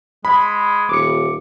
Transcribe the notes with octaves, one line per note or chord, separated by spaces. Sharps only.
G#3 B5
D#1 D6 C#7